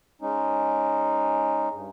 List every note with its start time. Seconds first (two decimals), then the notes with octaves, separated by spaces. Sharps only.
0.22 G#3 C#4 D#4
1.73 G2